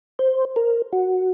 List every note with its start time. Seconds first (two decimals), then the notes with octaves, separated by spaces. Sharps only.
0.19 C5
0.56 A#4
0.93 F#4